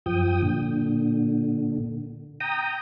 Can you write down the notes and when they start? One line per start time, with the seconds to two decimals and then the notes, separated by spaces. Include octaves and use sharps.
0.06 F#2 F3 G5 D#6
0.42 A#2 D3
2.40 G5 A#5 D#6